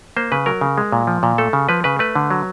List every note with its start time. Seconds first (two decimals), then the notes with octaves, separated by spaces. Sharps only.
0.17 A#3 C5
0.32 C#3 B4
0.46 F#3 A#4
0.61 C#3
0.78 G#3
0.92 A#2
1.07 F3
1.23 A#2
1.38 A3 A4
1.53 C#3
1.69 F3 B4
1.84 C#3 B4
1.99 A3 B4
2.15 D3
2.31 F#3